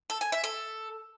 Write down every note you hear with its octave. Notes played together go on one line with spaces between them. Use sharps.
A4
G#5
E5
A4